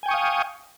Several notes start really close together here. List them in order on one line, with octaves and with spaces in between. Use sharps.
G#5 G5 C#6 D#6 F5